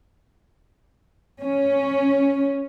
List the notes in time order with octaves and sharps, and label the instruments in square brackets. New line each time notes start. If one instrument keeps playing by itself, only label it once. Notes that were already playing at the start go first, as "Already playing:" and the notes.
[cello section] C#4